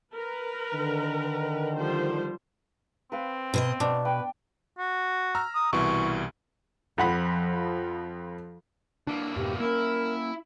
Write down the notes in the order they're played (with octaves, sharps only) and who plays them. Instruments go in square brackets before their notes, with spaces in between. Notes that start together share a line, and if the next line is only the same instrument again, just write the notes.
[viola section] A#4 B4
[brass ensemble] D3 D#3
[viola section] F3 G3 C5
[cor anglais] C4 [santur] B4 F5
[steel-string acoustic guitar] B2 C5 D#5
[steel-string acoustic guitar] B2 [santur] D4
[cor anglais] B4 [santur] G5
[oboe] F#4
[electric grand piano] A#5 E6 F6
[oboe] D#6
[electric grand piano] C2 B2 E3 [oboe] C#6
[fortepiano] F2 F#5 B5 [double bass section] F3
[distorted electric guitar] E3 A#3 [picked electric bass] D4
[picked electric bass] F2 G#2 B2 [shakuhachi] G4
[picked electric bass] A#3 C#4 [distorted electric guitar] E4 [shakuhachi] A#4